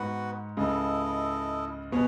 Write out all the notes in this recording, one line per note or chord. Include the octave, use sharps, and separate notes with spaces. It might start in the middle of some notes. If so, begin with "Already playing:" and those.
Already playing: G#2 B3 F#4 B4 F#5
C#2 C#3 E4 A4 D#5
B2 B3 G#4 C#5